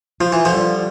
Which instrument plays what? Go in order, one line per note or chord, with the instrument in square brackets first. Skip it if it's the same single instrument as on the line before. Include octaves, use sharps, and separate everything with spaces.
[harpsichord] F3 [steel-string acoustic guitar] F4
[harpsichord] E3
D3 F3
[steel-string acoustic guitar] G3